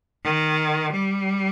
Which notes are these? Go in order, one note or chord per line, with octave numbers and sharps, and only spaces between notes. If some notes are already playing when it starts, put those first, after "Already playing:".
D#3
G3